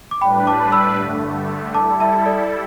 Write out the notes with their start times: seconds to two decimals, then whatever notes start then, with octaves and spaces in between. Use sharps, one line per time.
0.11 D6
0.21 A2 G3 D4 B4 G5 B5
0.47 A5 D6
0.72 B5 E6
0.98 G2 D3 A3
1.74 G3 E4 A4 A5 D6
2.00 E5 A5
2.26 A4 D5